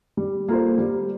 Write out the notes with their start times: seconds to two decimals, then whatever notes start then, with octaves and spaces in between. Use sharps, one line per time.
0.17 G3
0.49 A#3 F4 A4 C5
0.78 G3